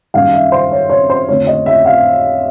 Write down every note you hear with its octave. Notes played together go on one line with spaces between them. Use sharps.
F#2 D#3 G3 A#3 F5
E5
C5
C#5
C#5
C5
F2 D3 F3 A3 C#5
D#5
E5
F5